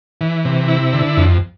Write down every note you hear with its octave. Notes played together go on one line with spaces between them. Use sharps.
E3
C3
E4
D3
F2